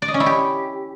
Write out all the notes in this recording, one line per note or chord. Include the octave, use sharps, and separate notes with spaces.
D5
D#5
C#4
E4
G4